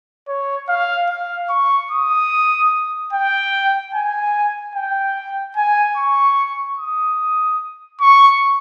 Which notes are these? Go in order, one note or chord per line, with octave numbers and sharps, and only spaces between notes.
C#5
F5
F5
C#6
D#6
G5
G#5
G5
G#5
C#6
D#6
C#6